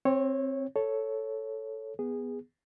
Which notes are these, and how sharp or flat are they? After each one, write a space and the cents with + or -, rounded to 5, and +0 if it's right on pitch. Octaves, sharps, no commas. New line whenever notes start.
C4 +15 C#5 -15
A4 +0 C#5 +0
B3 +0 G#4 -15